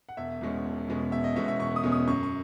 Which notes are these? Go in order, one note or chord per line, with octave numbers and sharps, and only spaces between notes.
F#5
E1 E5
E2 B2 G#3 C#4
E1
E2 B2 G#3 C#4
E1 E5
D#5
E2 B2 G#3 C#4 E5
E5
E1 C#6
D#6
E2 B2 G#3 C#4
D#6
F#2 C#6
C#6